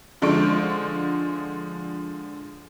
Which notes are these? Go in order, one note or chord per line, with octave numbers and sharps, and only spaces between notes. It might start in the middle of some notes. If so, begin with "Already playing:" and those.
D3 F3 G#3 C5 C#6 D7